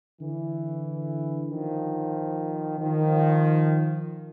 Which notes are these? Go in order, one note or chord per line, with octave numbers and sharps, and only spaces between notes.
D3 E3
D#3 F3
D#3 F3